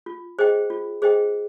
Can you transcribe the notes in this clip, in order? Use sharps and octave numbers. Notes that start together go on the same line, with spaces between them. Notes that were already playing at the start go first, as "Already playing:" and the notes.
F4
G#4 C5 D#5 G5
F4
G#4 C5 D#5 G5